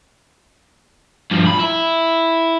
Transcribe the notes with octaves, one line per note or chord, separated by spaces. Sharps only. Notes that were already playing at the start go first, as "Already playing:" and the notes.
G2 F3
B5
E4